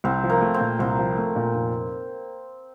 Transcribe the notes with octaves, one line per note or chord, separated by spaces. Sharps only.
C2 C4
F3
A#3
A3
C4
A#2
C2 C4
F3
A3
A#2
F1